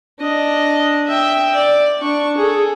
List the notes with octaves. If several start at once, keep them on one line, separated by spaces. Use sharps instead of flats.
D4 D#5
E5 G5
D5
D4 C#6
G#4 A4